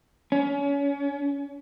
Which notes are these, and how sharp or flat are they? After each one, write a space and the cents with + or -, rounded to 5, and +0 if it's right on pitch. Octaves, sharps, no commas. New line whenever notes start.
C#4 +30